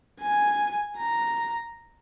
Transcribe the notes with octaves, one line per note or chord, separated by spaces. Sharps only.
G#5
A#5